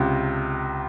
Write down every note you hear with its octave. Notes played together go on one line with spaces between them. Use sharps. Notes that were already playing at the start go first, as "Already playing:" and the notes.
Already playing: C#2 C3